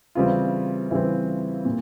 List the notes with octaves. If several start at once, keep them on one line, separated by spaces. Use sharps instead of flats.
C#3 E3 G3 C4 F4
C#3 E3 G3 C4 E4
A#2